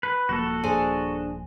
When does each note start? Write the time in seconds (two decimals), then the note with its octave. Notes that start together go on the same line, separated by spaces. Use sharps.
0.03 B4
0.29 D#1 F3 A#3 F#4 A4
0.63 D4 G#4 C5